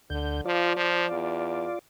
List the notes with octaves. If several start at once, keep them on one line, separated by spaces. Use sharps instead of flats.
D2 D3 G6
F3 F4 D5
F3
E2